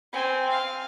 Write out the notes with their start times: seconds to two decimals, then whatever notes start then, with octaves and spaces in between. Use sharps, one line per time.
0.13 C4 G#5
0.49 F5